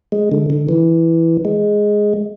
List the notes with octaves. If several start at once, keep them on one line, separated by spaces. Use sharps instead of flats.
G#3
D3
D3
E3
G#3